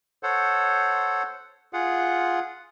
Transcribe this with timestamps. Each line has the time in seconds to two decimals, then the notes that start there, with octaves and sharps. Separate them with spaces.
0.23 A4 C5 C#5 F#5
1.73 F4 G#4 F#5